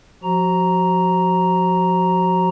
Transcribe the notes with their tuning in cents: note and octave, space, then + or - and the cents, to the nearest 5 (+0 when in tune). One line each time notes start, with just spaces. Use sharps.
F3 +30 F#4 +30 A#5 +0